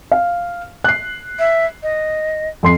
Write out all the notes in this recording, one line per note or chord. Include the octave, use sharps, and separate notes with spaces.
F5
F#6 C7
E5
D#5
F2 C6 C7